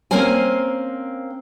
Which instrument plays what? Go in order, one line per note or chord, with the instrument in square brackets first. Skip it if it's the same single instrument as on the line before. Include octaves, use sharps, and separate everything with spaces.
[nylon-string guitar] A#3 C4 C#4 A#4 C5 G#5